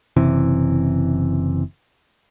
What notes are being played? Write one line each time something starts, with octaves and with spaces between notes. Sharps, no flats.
F#1 C3 E3